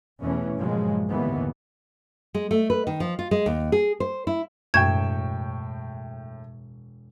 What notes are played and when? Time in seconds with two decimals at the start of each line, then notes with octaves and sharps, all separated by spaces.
0.22 E2 B2 E3 A3 C#4
0.58 G2 A#2 C#3 F3 F#3 G#3
1.09 G1 D#2 A2 D3 E3 B3
2.34 G#3
2.51 A3
2.70 B4
2.87 D#3
3.00 F3
3.19 F4
3.31 G#3
3.46 D#2
3.72 G#4
4.00 C5
4.27 E4
4.74 E1 F#2 A2 G5 C#6 G6 G#6 E7